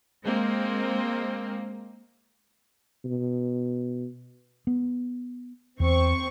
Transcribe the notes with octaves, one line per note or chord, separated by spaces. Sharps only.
G#3 A#3 C4
B2
B3
E2 C4 C#6